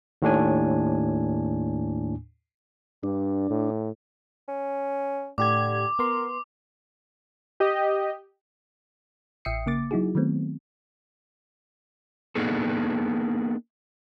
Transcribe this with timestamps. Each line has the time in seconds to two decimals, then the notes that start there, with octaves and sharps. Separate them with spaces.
0.22 D#2 A2 D4 G#5
3.04 G2 D4
3.50 A2
4.48 C#4
5.38 A2 D3 G4 D6 G#6
5.99 B3 A#4 C6
7.60 G4 D#5
9.45 A1 E5 G5 D#6 C7 C#7
9.66 C#3 A#3 D6 A6
9.91 F#3 D#4 E4 F#4 G#4
10.15 D#3 F#3 A3 B3 C4
12.35 A#3 B3 D4 D#4 G#4 A4